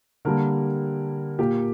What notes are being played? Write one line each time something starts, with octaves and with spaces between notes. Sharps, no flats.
D3 G3 A#3 A#4
A#2 A#3 G4